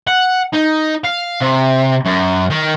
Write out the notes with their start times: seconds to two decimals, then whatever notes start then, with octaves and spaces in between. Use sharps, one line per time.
0.07 F#5
0.53 D#4
1.05 F5
1.41 C3
2.06 F#2
2.50 D#3